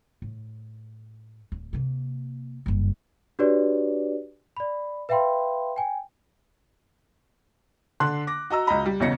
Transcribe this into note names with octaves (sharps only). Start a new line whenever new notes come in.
A2
D1
C3 A#3
F#1 G2
D4 F#4 G4 B4 C#5 D5
D5 B5
B4 E5 F5 G5 B5 C6
G5 G#5
D3 D4 C6 F#6
D6 A#6
F#4 D#5 A#5 E6
C#2 F#4 D#5 A#5 B5
G3
B1 E2 C#3 A#6 C#7